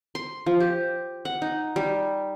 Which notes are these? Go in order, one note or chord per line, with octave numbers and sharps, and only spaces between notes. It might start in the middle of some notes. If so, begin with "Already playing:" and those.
C6
F3
G4
F#5
D#4
G3